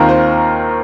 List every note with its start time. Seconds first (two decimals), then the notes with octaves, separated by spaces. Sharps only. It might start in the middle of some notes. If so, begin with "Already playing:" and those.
Already playing: D#2 D#3 C4 F4 A#4
0.09 C5